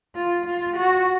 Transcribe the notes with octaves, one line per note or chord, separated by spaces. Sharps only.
F4
F4
F#4